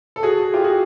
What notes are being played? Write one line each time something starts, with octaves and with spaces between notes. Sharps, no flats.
A4
F#4 G#4
F4 G4
F#4 G#4